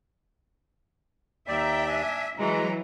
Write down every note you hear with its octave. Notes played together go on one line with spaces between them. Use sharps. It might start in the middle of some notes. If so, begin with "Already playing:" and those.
D#2 D5 E5 G5 A#5
D4 G#5
E3 F#3 G#3 A#5